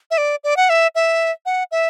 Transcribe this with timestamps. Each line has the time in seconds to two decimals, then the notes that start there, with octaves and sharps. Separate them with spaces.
0.11 E5
0.18 D5
0.44 D5
0.57 F#5
0.69 E5
0.95 E5
1.46 F#5
1.71 E5